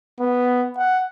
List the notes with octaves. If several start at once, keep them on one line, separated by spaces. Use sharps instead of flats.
B3
F#5